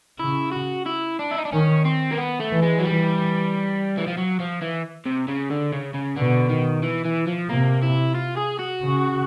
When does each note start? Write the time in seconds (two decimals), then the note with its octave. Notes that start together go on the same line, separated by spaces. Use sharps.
0.19 C#3 E4
0.53 F#4
0.86 E4
1.19 D4
1.31 E4
1.38 D#4
1.45 D4
1.52 D#3 C#4
1.85 C4
2.12 A#3
2.18 B3
2.40 A3
2.51 E3
2.63 G#3
2.79 F#3
2.85 E3 G3
3.98 E3
4.07 F3
4.18 F#3
4.40 F3
4.62 E3
5.06 C3
5.28 C#3
5.50 D3
5.72 C#3
5.94 C#3
6.16 B2 D3
6.49 D#3
6.83 E3
7.05 E3
7.27 F3
7.49 C3 A#3
7.83 E4
8.15 F4
8.37 G#4
8.59 F#4
8.82 C#3